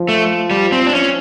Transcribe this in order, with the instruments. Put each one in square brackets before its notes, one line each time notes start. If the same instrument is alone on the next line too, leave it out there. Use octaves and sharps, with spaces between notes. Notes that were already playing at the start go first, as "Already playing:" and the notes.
Already playing: [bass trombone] F3
[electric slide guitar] A3
G3
C4
D4
C#4